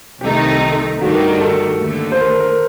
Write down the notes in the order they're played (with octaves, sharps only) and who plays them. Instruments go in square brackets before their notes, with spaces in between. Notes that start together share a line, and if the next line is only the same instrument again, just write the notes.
[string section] C2 C3 D#3 A3 D#4 [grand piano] G4
[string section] G2 D#3 A3 D4 [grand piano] F#4
[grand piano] A#4
G4
A4
[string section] D#2 D3 A3
[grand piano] C5
A#4
A#4